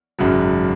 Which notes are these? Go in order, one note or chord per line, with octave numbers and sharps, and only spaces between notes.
G#1 F#2 C#3 F#3